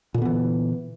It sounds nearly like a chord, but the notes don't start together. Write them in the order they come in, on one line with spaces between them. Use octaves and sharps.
A#2 D3 B3 E3